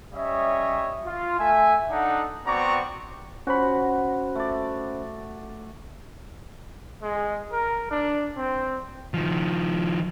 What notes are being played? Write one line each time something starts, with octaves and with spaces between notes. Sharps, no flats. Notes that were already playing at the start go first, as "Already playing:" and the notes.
G3 C#4 C#5 D#5 E5
F4
A3 E5 G#5
D4 D#4 A4 F#5
B3 C4 F#4 D5 A#5 C#6
C#4 F#4 C5 B5
A3 D5
G#3
A#4
D4
C4
D#3 F3